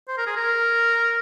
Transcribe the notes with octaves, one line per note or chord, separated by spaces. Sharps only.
C5
A#4
G#4
A#4